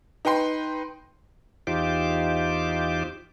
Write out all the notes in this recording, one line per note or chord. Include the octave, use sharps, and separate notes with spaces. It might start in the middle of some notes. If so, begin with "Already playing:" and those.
D#4 B4 G5 C6
E2 D#4 F4 G4 C5 D6